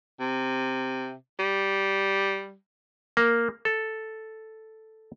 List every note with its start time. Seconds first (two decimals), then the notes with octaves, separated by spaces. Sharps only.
0.20 C3
1.39 G3
3.17 A#3
3.65 A4